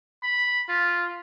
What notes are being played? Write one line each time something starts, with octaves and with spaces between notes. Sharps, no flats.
B5
F4